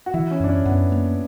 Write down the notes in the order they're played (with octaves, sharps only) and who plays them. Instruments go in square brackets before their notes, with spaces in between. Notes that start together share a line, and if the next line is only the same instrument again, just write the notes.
[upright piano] F#4
[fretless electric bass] E3 [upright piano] E4
[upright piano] C#4
[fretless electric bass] F#2 [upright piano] D4
[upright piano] C#4
[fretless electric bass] F#2 [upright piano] B3
[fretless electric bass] A#3